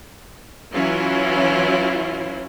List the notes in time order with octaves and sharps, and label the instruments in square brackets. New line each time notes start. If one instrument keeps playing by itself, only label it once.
[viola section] E3 F#3 C#4 E4 F4